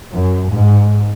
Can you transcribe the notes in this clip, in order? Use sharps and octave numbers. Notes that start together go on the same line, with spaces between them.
F#2
G#2